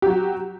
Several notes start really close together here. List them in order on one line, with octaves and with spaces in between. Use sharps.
G4 F#3 F#4